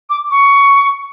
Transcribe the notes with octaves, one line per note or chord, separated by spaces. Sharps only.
D6
C#6